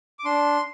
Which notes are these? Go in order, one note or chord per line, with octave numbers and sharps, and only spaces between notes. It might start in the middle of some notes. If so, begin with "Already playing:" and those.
D6
D4 C6